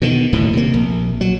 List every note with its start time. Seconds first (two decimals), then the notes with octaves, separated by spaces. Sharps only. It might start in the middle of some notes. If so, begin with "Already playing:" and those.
0.02 B2 D3 D#3
0.33 D#1 D2 A2 D#3
0.53 C3 A#3
0.74 A#1
1.21 F#3